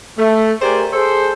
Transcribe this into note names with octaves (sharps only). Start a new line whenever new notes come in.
A3
G4 G#4 A#4 C5 D5 G#5
G#4 A4 C5